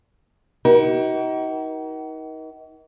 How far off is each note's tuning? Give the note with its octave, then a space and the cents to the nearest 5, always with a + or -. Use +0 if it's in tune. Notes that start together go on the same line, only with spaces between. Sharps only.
D#4 +35 F#4 +45 A#4 +35